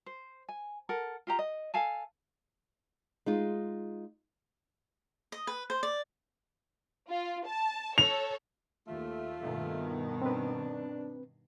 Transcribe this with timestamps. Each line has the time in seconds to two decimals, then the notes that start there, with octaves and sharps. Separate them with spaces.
0.06 C5
0.49 G#5
0.89 A4 A#4 F#5
1.27 F4 G4 A#5
1.39 D#5
1.74 A4 F5 G#5 A5
3.26 G#3 D#4 F4
5.32 D#5
5.47 B4
5.70 C5
5.83 D5
7.09 F4
7.46 A5
7.98 A4 C#5 F7
8.88 D#2 A3 F4
9.40 G2 B2 D#3
10.22 C4 D4 B4